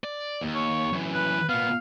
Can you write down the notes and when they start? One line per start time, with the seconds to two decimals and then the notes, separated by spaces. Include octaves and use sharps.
0.04 D5
0.41 D#2
0.55 C#5
0.93 F#2 E3
1.13 B4
1.49 A#2 B3 F5